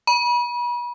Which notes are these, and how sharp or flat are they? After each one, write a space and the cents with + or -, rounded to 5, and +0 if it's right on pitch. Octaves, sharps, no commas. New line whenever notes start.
B5 -35